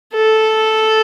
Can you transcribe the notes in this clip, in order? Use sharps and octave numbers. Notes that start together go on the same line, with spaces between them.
A4